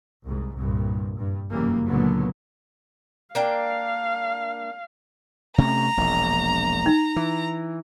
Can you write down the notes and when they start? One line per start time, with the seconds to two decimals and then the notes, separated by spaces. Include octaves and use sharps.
0.24 C2 G#2
0.56 C2 G2 A#2
1.17 G2
1.50 F1 F#2 C#3 E3 G3 A#3
1.86 C#2 A#2 D3 F#3 A#3 B3
3.35 A#3 D4 F5 G5
5.58 C3 A3 C#4 A#5
5.97 E1 A#1
6.86 D#4
7.16 E3